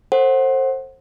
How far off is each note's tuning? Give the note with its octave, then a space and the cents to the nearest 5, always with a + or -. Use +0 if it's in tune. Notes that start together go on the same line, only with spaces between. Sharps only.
A4 +35 C5 +25 F#5 +0